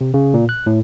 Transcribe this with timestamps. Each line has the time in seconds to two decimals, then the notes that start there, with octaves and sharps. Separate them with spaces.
0.01 C3
0.14 C#3
0.34 A#2
0.49 F#6
0.66 A2